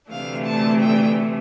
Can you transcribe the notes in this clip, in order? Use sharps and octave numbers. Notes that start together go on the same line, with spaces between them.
D2 C3 E3 A3 D4 F5
A5
G5